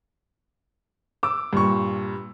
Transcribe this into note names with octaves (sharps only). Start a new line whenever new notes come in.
D6 E6
G2 A#2 C#6